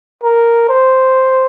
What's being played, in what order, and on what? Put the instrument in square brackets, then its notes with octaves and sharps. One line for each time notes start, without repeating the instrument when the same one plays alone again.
[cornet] A#4
C5